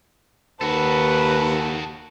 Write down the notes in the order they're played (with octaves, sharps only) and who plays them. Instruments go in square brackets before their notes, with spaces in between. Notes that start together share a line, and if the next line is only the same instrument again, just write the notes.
[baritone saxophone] D#2 [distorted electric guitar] F#4 A4 [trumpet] B4 [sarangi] A5